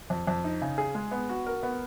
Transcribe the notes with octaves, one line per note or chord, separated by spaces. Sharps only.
F2
F2
D#4
C#3
G#4
G#3
B3
F#4
A#4
B3